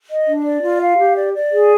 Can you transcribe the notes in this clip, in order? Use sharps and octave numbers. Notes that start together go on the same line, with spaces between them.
D#5
D4
D5
F4
F5
G4
D5
D5
G#4